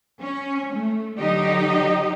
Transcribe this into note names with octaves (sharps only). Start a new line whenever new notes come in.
C#4
A3
D3 F#3 D#4 G4 D#5